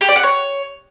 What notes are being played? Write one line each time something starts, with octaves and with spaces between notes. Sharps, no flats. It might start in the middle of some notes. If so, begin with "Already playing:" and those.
G4
D5
F#5
C#5